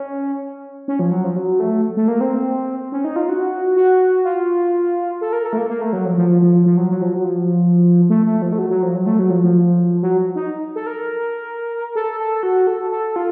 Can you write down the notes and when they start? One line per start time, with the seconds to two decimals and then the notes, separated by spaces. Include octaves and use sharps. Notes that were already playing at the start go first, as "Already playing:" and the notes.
Already playing: C#4
0.88 C#4
0.99 F3
1.11 F#3
1.24 F3
1.36 F#3
1.60 A3
1.97 A3
2.08 A#3
2.21 C4
2.92 C#4
3.04 D#4
3.16 F4
3.29 F#4
3.76 F#4
4.25 F4
5.21 A4
5.33 A#4
5.45 A4
5.53 A3
5.57 A#3
5.69 A#3
5.81 A3
5.93 F#3
6.05 F3
6.17 F3
6.42 F3
6.66 F3
6.77 F#3
6.90 F#3
7.02 F3
7.14 F#3
7.24 F3
8.10 A3
8.26 A3
8.42 F3
8.52 A3
8.58 F#3
8.70 F#3
8.82 F3
8.95 F#3
9.06 A3
9.19 F#3
9.30 F3
9.43 F3
10.02 F#3
10.36 D#4
10.76 A4
10.87 A#4
11.96 A4
12.20 A4
12.43 F#4
12.67 A4
12.92 A4
13.16 F4